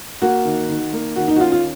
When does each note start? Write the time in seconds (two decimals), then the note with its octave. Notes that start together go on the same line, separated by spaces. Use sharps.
0.22 A#3 F#4
0.45 D#3
0.69 D#3
0.93 A#3
1.16 D#3 F#4
1.28 D#4
1.36 F#4
1.40 C#4 F4
1.52 F4